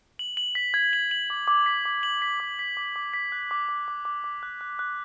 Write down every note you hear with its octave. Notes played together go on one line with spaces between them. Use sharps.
F#7
F#7
B6
G#6
F#7
F#7
D6
D6
B6
D6
F#7
B6
D6
B6
D6
D6
B6
F#6
D6
D6
D6
D6
D6
F#6
F#6
F#6